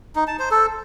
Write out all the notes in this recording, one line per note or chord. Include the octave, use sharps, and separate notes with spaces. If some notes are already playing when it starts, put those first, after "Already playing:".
D#4
A5
C5
A4